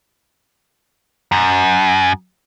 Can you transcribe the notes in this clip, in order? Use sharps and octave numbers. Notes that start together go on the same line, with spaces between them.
F#2